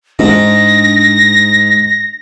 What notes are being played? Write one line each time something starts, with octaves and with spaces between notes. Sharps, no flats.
G#2 C#4 D4 A#6